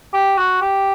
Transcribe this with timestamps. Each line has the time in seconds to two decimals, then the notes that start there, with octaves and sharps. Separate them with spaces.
0.13 G4
0.38 F#4
0.62 G4